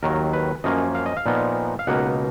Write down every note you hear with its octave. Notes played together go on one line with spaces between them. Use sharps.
D#2 D#3 F#3 A#4
B4
F#2 F3 A#3 C#4 D#5
F5
D#5
F5
A#2 F3 B3 D#4
F5
C#2 B2 A#3 D#4 F#5